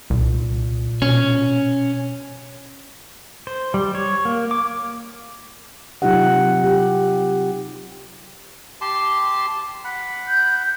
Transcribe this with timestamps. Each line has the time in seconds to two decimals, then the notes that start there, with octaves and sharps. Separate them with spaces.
0.10 C2 A#2
1.02 B2 C#4
3.47 C5
3.74 G3
3.95 C#5
4.25 A#3
4.51 D6
6.02 C3 F#3 D#4 F4 G4 F#5
6.64 G4
8.81 G4 A5 C6
9.84 F#5 B5
10.28 G6